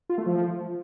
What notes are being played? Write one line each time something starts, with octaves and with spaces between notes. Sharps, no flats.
F4
A3
F3